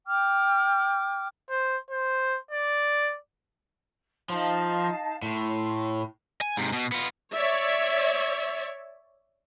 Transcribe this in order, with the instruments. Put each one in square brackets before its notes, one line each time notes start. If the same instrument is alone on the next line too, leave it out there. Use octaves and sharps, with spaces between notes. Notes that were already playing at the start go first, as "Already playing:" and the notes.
[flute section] G5 D6 F6
[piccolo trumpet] C5
C5
D5
[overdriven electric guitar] F3 [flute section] D#4 F5 A5
[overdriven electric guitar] A2 [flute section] C6
[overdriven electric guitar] G#5
G#2 C3
B2
B3 F4
[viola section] C#5 D5 E5